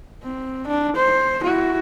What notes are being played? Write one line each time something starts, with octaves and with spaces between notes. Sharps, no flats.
C4
D4
C5
E4 F#4